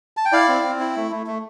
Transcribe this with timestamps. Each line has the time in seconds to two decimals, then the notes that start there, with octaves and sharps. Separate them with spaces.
0.17 A5
0.25 G5
0.32 E4 D5 F5
0.48 C4
0.64 C4
0.80 E4
0.96 A3
1.11 A3
1.27 A3